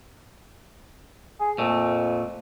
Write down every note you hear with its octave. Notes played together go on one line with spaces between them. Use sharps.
G#4
F2 A#2 A3